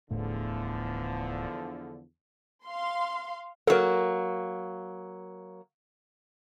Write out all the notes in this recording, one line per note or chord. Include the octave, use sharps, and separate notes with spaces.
D1 E2 A2 D3 F3 A3
F5 C6
F#3 A#3 A4 A#4